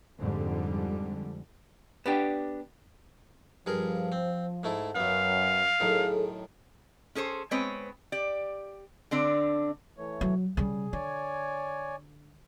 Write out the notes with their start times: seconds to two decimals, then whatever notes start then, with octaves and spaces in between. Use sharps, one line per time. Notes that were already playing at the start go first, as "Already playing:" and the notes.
0.19 F2 G#2 D3 G3
2.06 B3 D4 G4
3.66 G2 F3 G#4 A#4
4.12 C4
4.63 G#2 A3 E4
4.95 F#2 F#3 B3 F5
5.80 F#2 A2 D#3 G#4 A4
7.15 C#4 G#4 A4 C5
7.51 G#3 B3 C4 B4 C#5
8.12 G4 D5
9.11 D3 C4 D4 D5
9.98 E3 A3 C#5
10.21 F#3
10.57 C#3 G3 G#4
10.93 D3 C#5 D5 G#5